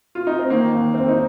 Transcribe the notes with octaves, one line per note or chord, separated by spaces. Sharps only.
F4
D#4
C4
D#3 A#3
D#2
F1 C4
D#4